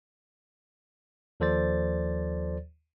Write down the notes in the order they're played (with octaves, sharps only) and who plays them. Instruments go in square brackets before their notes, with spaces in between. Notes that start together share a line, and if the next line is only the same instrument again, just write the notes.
[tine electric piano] D#2 F3 A4 C5 D5 A6